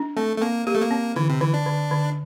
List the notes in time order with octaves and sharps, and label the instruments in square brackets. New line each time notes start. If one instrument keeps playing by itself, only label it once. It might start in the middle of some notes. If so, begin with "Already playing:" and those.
Already playing: [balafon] D4
[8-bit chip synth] A3 [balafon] C4
[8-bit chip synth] A3
[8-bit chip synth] A#3 [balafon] C4
[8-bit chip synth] A#3 [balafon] G4
[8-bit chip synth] A3
A#3
[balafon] C4
[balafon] D3 [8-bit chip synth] E3
[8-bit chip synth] C3
[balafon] D3 [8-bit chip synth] E3
[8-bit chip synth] D4
[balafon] D3
D3